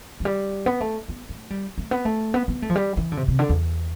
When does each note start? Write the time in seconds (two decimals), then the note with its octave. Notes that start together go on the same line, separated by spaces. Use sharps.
0.20 F3
0.25 G3
0.66 B3
0.81 A3
1.09 B3
1.29 A3
1.50 G3
1.78 A3
1.91 B3
2.05 A3
2.34 B3
2.48 B3
2.62 A3
2.70 F3
2.76 G3
2.97 E3
3.12 D3
3.17 C3
3.28 C3
3.39 D3
3.49 E2